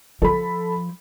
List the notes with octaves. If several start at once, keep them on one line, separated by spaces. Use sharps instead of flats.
F3 A4 B5